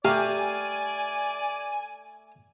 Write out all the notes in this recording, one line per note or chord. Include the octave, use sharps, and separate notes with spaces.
A3 G4 A#4 D5 F5 G#5